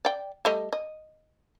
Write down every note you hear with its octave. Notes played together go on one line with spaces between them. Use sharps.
D5 G5
G3 A3 D#5
D#5